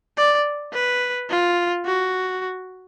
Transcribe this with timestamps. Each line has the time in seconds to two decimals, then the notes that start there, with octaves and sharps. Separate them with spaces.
0.18 D5
0.73 B4
1.30 F4
1.86 F#4